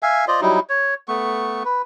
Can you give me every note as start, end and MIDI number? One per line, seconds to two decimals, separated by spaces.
0.03 0.25 76
0.03 0.25 77
0.03 0.25 80
0.28 0.41 65
0.28 0.41 72
0.28 0.41 74
0.28 0.41 75
0.41 0.60 54
0.41 0.60 55
0.41 0.60 63
0.41 0.60 64
0.69 0.94 73
1.08 1.63 57
1.08 1.63 59
1.08 1.63 85
1.65 1.82 71